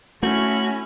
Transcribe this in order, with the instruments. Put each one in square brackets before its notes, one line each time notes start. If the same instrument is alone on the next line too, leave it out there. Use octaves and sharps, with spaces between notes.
[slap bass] A3 [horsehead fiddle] C#4 E4 [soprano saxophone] F#4